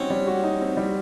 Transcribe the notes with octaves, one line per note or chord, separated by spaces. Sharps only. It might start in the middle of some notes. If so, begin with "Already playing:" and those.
Already playing: G3 C4 C#4 D#4 F#4
G3
F#4
D#4
C4
G3